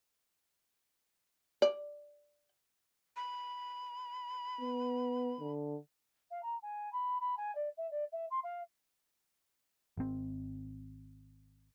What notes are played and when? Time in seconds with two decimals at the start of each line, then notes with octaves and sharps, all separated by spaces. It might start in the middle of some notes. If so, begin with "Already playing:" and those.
1.62 D5
3.16 B5
4.61 B3
5.40 D3
6.30 F5
6.42 A#5
6.62 G#5
6.92 B5
7.20 B5
7.37 G#5
7.55 D5
7.77 E5
7.91 D5
8.12 E5
8.30 C6
8.43 F5
9.97 G#1 C4